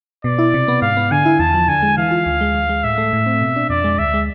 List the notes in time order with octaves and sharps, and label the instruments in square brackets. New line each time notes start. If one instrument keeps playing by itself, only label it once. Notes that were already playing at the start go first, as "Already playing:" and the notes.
[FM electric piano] B2 [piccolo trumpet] D5
[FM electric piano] E4
C3
B3
[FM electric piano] G#2 [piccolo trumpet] F5
[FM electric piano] B3
[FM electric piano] D3 [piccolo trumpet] G#5
[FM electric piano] E4
[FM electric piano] E2 [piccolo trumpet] A5
[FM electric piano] F3
[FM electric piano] D3 [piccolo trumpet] G#5
[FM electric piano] G#3
[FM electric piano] E3 [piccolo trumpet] F5
[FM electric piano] F4
D2
G#3
D2
G#3
[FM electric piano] A2 [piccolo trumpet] E5
[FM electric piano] A3
A2
C4
B2
D4
[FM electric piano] F2 [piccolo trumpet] D5
[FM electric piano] G#3
[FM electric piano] D2 [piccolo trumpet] E5
[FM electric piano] G#3